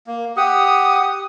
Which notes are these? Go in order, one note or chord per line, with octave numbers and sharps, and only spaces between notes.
A#3
G4 F#5 D#6